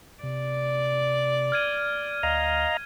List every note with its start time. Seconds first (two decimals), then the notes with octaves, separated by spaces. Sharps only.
0.23 C3 D5
1.52 F6 G#6 D#7
2.23 D2 D#5 F5 A#5